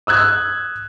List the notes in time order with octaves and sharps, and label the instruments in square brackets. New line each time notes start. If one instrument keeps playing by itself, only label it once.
[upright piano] D#6 E6 F#6 G#6